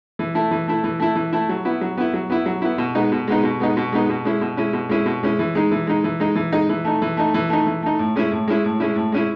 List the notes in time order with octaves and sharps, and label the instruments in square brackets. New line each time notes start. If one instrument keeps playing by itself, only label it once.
[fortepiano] E3
A3 E4
E3
A3 E4
E3
A3 E4
E3
A3 E4
F#3
B3 E4
F#3
B3 E4
F#3
B3 E4
F#3
B3 E4
B2
G#3 B3 D#4
B2
G#3 B3 D#4
B2
G#3 B3 D#4
B2
G#3 B3 D#4
B2
G#3 C#4 E4
B2
G#3 C#4 E4
B2
G#3 C#4 E4
B2
G#3 C#4 E4
E3
G#3 D#4
E3
G#3 D#4
E3
G#3 D#4
E3
G#3 D#4
E3
A3 D#4
E3
A3 D#4
E3
A3 D#4
E3
A3 D#4
A2
G#3 C#4 E4
A2
G#3 C#4 E4
A2
G#3 C#4 E4
A2
G#3 C#4 E4